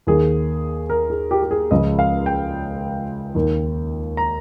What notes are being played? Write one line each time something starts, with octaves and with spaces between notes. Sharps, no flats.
D#2 D#3 G#4
A#4
G#4
G4
G4
G#4
C#2 C#3 F3 D#5
F5
G5
D#2 D#3
A#5